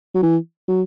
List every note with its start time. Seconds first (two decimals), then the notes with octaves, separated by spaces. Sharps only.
0.15 F#3
0.22 E3
0.68 F#3